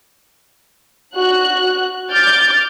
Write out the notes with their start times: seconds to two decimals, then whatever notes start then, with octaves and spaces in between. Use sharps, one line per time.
1.16 F#4 F#6
2.11 D6 F6 G6 A6 D7